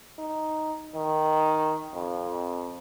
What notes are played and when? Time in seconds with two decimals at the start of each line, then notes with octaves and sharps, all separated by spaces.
0.19 D#4
0.95 D#3
1.94 F2